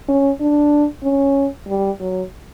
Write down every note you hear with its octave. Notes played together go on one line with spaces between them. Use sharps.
C#4
D4
C#4
G3
F#3